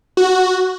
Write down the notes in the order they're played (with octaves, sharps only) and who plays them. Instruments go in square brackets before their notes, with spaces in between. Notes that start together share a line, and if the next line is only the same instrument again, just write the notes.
[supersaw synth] F#4